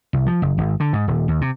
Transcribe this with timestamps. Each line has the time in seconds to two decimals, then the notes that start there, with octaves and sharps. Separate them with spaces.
0.13 C2
0.26 F3
0.42 F#1
0.58 G#1
0.80 D3
0.93 G#2
1.08 D#1
1.28 D#2
1.41 C3